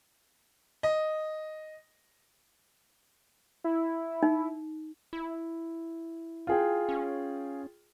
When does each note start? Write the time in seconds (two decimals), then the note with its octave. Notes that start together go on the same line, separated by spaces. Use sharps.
0.83 D#5
3.64 E4
4.23 D#4
5.13 E4
6.47 F4 G#4 G5
6.89 C#4